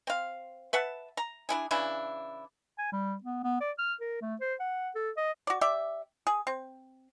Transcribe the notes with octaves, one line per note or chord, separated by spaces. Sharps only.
C4 F5
B4 E5 F#5 A5
A#5
D4 E4 G#4
C#3 E3 D4 E4
G#5
G3
B3
B3
D5
F6
A#4
A3
C5
F#5
A4
D#5
F#4 D5
G4 D5 E5
G#4
C4